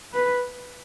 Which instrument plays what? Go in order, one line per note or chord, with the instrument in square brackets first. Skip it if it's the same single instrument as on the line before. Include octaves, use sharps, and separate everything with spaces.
[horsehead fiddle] B4